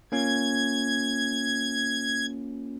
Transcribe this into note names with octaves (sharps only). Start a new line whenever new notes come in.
A#3 C#4 F4 G#6